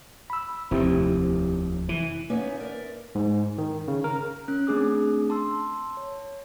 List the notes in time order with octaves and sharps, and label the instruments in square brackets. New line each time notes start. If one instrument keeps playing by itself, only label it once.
[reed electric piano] B5 E6
[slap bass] F1 D#2 [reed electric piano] C4 E4 G4
[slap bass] E3
[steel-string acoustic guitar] A#3 B3 C#4 D#4 B4 E5
A#4 D5 E5
[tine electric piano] G#2
D#3
C#3
A#4
[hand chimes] C#4 F#6
A3 C4 D4 G#4 D6 D#6
A5 C6 E6
C#5